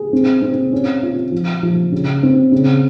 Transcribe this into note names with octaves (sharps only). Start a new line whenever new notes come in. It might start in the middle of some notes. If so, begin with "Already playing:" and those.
Already playing: G#4
C4
C4
C#4
F4
F3
F3
C#3
C4
C#3